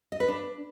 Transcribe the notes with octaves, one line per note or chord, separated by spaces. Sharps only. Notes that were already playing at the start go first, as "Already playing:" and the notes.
D#5
B4
D4